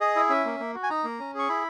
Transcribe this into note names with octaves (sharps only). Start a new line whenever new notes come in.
G#4 D#5
E4
C#4 E5
A#3
A#3
F#4
G#5
D#4 A#5
A#3
C#4
G#4 C#6
E4 B5